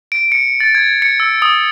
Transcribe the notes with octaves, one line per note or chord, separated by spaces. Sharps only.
D7
C#7
A6
G#6
C#7
E6
D#6